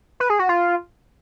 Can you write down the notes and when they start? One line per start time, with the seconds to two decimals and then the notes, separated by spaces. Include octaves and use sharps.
0.20 B4
0.30 G#4
0.39 F#4
0.49 F4